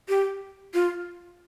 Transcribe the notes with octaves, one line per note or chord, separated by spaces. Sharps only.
G4
F4